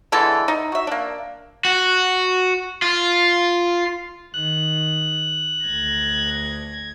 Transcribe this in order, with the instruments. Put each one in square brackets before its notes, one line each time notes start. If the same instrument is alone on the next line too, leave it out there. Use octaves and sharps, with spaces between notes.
[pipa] D3 E3 G#3 A4
D#4
F#4 E5
A#3 D4
[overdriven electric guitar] F#4
F4
[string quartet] D#3 [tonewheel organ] F#6
[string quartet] D2 G#6 A#6